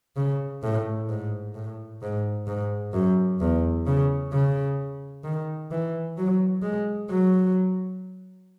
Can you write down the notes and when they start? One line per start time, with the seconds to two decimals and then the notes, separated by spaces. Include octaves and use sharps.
0.16 C#3
0.63 A2
1.09 G#2
1.54 A2
2.02 G#2
2.47 G#2
2.93 F#2
3.40 E2
3.86 C#3
4.33 C#3
5.24 D#3
5.71 E3
6.17 F#3
6.62 G#3
7.10 F#3